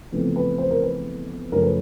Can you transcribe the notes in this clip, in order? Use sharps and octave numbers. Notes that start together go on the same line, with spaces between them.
E2 C#3 F3 A3 C4
B4
C5
A#4
B4
F#2 C#3 F3 A3 C#4 A#4
B4